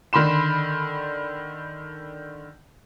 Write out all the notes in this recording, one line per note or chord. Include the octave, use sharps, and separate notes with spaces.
D3 D#3 B5 C6 E7